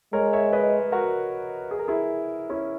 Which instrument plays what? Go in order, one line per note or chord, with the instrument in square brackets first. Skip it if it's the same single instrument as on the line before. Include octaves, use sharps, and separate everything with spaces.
[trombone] G#3 [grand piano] A#4 C#5
[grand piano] C#5 E5
B4 D#5
F#4 A#4
G#4
A#4
E4 G#4
C#4 E4